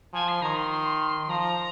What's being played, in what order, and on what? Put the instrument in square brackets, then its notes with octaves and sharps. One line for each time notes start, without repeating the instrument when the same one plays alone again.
[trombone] F3 [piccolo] G#5
[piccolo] C6
[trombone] D#3 [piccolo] A#5
[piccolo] C6
C6
[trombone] F3 [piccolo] A#5